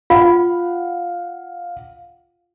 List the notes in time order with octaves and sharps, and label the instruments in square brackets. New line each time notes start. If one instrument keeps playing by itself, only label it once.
[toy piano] F4 [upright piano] F5 F#5